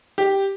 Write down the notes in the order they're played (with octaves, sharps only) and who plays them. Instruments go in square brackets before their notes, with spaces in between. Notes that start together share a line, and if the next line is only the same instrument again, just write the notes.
[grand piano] G4